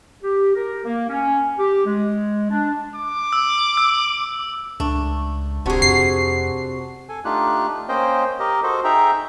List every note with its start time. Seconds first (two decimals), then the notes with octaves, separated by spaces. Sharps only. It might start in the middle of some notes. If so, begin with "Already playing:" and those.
0.22 G4
0.55 A#4
0.85 A#3
1.09 C#4
1.58 G4
1.85 G#3
2.51 D4
2.95 D6
3.33 E6
3.77 E6
4.80 C#2 A3 D4
5.66 D1 C3 D4 F#4 G#4 A#5
5.82 F2 C7
7.09 A4 G#5
7.25 A3 D4 D#4 F4 G4 F#6
7.89 A#3 C#4 C5 D#5 G5
8.40 G4 A#4 D#5
8.63 F#4 A4 C5 D#5
8.84 D#4 G#4 E5 G5 A#5